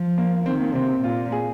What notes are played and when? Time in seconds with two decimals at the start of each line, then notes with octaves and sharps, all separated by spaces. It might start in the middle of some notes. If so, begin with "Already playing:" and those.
Already playing: F3
0.18 A#3
0.46 D#3 C4
0.60 A#3
0.75 C3 C4
1.03 A#2 F4
1.32 G#4